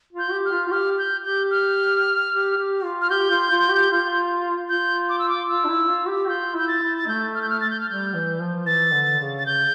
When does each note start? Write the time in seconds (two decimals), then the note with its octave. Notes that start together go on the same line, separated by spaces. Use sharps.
0.13 F4
0.19 G6
0.32 G4
0.45 F6
0.52 F4
0.68 F4
0.71 G4 F6
0.99 G6
1.25 G4 G6
1.51 F6
2.31 G4
2.57 G4
2.84 F4
3.01 F6
3.10 G4 G6
3.30 F4
3.50 F4
3.71 G4
3.90 F4
4.69 F4 G6
5.09 D6
5.19 E6
5.29 D6
5.49 F4 E6
5.65 D4
5.69 E4
5.89 F4
6.08 G4
6.29 F4 G6
6.55 E4 G6
6.68 A6
6.82 E4
6.98 A6
7.07 A3 G6
7.35 F6
7.42 G6
7.50 F6
7.61 A6
7.70 G6
7.80 F6
7.87 G3 G6
8.14 E3
8.41 F3
8.66 E3 A6
8.93 D3
9.20 C#3
9.39 A6
9.46 C#3 G6